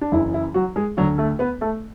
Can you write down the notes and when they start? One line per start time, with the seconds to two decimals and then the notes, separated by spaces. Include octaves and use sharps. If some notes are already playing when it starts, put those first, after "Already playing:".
0.01 D4
0.12 F#1 F#2 E3 E4
0.34 E4
0.54 F#3 F#4
0.76 G#3 G#4
0.97 D2 D3 F#3 F#4
1.18 A3 A4
1.39 B3 B4
1.61 A3 A4